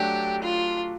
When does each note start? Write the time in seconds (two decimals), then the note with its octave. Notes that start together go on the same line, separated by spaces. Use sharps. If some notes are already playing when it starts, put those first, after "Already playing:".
Already playing: F#3 A3 D4 F#4 G4
0.42 F4